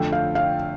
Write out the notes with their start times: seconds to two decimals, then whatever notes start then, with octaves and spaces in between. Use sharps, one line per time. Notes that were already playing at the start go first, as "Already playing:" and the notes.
Already playing: F2 D3 A3 D4 A4 G5
0.13 F5
0.35 F5